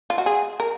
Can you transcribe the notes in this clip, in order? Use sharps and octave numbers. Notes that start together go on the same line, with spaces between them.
F4
F#4
G#4
A#4